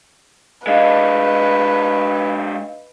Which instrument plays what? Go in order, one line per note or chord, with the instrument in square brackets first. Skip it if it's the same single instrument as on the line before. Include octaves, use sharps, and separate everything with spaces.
[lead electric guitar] G#3 D4 [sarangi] B4 [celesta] D#5 F5